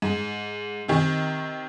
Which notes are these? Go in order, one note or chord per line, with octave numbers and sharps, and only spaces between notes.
G#2
C3 D#3